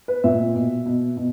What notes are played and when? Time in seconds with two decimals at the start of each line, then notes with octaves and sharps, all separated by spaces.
0.08 B4
0.24 A#2 E5
0.55 B2
0.86 B2
1.17 B2